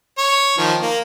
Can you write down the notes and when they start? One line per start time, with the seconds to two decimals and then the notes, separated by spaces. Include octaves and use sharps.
0.18 C#5
0.58 D#3 F3
0.82 A#3